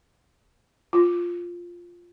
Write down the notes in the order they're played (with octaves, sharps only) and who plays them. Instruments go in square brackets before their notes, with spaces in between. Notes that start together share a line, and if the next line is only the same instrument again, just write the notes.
[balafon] F4